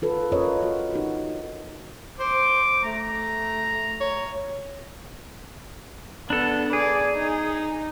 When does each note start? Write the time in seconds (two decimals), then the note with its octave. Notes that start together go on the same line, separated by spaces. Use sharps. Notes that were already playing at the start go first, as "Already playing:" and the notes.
0.02 F4 A4 B4
0.32 C#4 F4 A#4 B4 C#5 D#5
0.63 F#4
0.93 D#4 F#4 A#4
2.19 C5 D6
2.84 A3 A#5
4.01 C#5
6.30 B3 D4 A4
6.73 G#4 D5
7.15 D#4